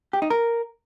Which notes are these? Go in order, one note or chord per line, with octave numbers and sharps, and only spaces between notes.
G4
D#4
A#4